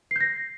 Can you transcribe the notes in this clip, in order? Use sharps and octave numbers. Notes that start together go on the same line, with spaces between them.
G6 A#6 C7